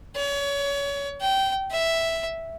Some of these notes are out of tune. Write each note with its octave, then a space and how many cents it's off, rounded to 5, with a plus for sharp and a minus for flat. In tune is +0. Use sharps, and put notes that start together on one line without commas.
C#5 +30
G5 -20
E5 +0